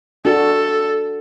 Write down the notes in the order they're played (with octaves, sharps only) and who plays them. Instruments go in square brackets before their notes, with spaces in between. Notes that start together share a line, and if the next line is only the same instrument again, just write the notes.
[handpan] D4 F#4 [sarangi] A4